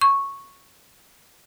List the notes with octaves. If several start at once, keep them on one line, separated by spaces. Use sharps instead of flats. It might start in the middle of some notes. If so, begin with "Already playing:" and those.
C#6